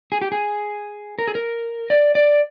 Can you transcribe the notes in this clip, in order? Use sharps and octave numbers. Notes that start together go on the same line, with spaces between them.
G#4
G4
G#4
A#4
G#4
A#4
D5
D5